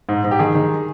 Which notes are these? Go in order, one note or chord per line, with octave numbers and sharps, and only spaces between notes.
G#2
G#2
G4
D#3 G#4
D#3